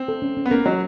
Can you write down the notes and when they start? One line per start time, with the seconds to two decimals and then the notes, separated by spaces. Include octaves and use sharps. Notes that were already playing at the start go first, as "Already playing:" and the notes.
Already playing: C4
0.08 A4
0.22 C#4
0.37 C#4
0.46 B3
0.51 A#3 C#4
0.65 F#3 D#5